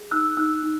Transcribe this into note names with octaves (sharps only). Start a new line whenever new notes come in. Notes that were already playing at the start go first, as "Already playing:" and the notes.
Already playing: G#4
D#4 E6 F#6
D#4 E6 F#6
D#4